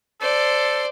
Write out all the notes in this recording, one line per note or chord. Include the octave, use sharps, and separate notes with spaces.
A4 C5 D5